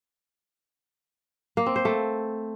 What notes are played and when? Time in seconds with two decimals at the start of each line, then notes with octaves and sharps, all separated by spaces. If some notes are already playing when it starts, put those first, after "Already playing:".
1.57 A#3
1.66 C4
1.76 C5
1.85 A3